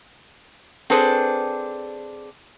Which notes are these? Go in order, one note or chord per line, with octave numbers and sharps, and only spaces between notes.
C4 D4 G#4 A4 B4 C5